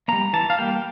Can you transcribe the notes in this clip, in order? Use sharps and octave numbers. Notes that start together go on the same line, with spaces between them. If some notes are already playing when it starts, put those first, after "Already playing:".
G3 A#3 A#5
E3 A5
F5
G3 A#3 G5